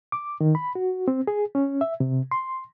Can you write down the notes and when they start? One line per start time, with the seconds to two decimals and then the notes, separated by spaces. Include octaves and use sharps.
0.12 D6
0.41 D#3
0.55 B5
0.75 F#4
1.08 C4
1.27 G#4
1.55 C#4
1.81 E5
2.00 C3
2.31 C6